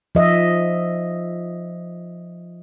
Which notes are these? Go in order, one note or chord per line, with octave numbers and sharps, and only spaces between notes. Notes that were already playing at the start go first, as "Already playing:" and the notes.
F3 D#5 E5